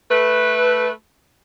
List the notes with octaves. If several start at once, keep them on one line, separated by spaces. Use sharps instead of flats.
A3 B4